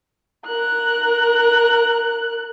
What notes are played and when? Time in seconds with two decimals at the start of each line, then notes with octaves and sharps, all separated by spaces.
0.47 A#4 F#6